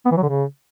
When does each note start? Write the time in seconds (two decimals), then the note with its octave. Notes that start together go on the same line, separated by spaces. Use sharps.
0.06 B3
0.11 E3
0.17 F#3
0.23 D3
0.29 C#3